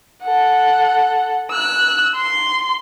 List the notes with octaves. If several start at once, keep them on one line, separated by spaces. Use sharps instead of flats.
A4 F#5
E6 F#6
C6